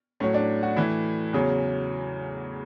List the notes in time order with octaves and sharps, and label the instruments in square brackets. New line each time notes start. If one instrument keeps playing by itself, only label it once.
[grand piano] A2 F#3 C#4
D4
F#4
A2 E3 E4
E2 C#3 F#3